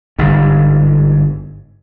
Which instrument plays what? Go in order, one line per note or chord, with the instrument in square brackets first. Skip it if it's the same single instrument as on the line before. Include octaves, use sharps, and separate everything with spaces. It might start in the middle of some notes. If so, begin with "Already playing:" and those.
[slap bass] G1 G#2